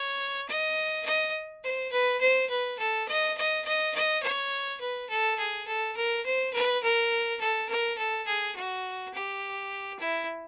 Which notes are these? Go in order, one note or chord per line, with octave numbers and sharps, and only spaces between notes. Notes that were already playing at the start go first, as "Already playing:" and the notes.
Already playing: C#5
D#5
D#5
C5
B4
C5
B4
A4
D#5
D#5
D#5
D#5
C#5
B4
A4
G#4
A4
A#4
C5
B4
A#4
A4
A#4
A4
G#4
F#4
G4
E4